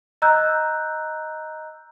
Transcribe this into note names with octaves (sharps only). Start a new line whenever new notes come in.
D#5 A#5 E6 F#6 G6